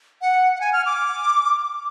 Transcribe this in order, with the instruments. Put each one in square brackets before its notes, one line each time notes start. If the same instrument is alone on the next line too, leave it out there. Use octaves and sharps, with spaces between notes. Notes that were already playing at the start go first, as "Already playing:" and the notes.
[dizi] F#5
F#5
G#5
F6
D6